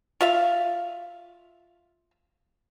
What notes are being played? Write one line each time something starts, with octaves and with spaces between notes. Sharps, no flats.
F4 E5 F5